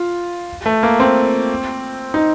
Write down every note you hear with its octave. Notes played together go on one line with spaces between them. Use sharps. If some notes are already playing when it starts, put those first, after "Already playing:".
Already playing: F4
A3
A#3
C4
D#4